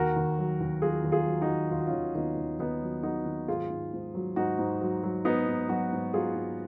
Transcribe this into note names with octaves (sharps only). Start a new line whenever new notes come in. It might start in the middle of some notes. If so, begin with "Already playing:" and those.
Already playing: D#2 F#4 A#4
D#2
F#3
D#2
F#3 F4 G#4
D#2
F4 G#4
F#3
D#4 F#4
D#2
D#2 F4
F#4
C#4 F4
D#2
D#2 B3 D#4
D#2
D#2 B3 D#4
F#3
F#3 D#4 F#4
D#3
G#2 F4 G#4
G#2
G#2
F#3
G#2 D#4 F#4
G#2
F#3
F#3
G#2 B3 D#4
G#2
F#3 D#4 F#4
G#2
F#3 F4 G#4
G#2